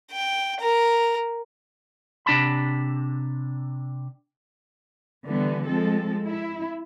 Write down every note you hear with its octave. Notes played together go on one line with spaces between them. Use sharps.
G5
A#4
C3 D4 A5 B5
D3 E3 G3 B3
F3 G#3 C4 A4
E4